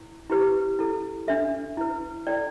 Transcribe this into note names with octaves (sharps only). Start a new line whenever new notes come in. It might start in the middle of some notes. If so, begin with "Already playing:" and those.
Already playing: E4
E4 G4 B4
E4 A4
D4 A4 E5
E4 B4
E4 A4 D5 G5